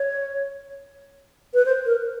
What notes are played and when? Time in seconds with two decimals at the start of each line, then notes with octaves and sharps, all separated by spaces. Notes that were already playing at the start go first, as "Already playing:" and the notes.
Already playing: C#5
1.54 B4
1.66 C5
1.86 A#4